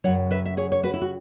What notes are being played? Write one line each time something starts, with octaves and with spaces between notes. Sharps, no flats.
F#2 C#3 F#3 C#5 F#5
B4 E5
E5
G#4 C#5
C#5
F#4 B4
E4
F#4